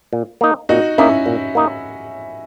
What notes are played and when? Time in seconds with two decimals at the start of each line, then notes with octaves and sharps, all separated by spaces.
0.13 A#2
0.41 A#3 D#4
0.69 A#2 D#4 F#4
0.98 A#3 C#4 D#4 E4
1.26 A#2
1.55 A#3 D#4